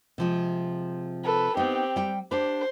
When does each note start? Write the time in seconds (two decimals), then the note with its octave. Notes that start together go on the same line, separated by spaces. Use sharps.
0.18 C3 F3 G#3
1.24 A4 B4
1.57 B3 C4 D#4 G4
1.96 G3 G5
2.31 D4 G4 C5